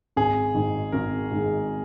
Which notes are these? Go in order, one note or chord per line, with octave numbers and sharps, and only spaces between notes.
G#1 G#4
G#2 D#3 G#3
G#1 A#4
G#2 D#3 G#3